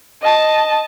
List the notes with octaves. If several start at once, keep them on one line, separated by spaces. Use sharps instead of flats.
D#5 A5